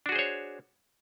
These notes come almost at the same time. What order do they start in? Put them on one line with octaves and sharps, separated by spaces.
D4 F#4 G#4 C5 C#5